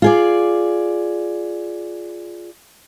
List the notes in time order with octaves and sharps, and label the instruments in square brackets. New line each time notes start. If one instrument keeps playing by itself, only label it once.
[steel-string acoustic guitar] F4 G#4 D5